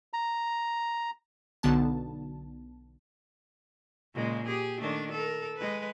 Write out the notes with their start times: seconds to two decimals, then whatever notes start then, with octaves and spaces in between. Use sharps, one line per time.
0.13 A#5
1.63 B1 D3 B3 A5
4.14 A#2 C#3 G#3
4.47 G4 G#4
4.80 D#3 A3 D4
5.12 A4 A#4
5.57 G#3 B4